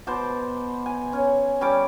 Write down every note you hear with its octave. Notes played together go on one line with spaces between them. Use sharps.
B2 C5 A5 D6
G#5
C#4
G3 C#4 A4 D6